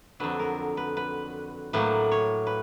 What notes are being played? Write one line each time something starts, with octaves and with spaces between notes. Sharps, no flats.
F2 D3 F#3 B4
A#4
B4
B4
A2 F#3 A#3 B4
C#5
B4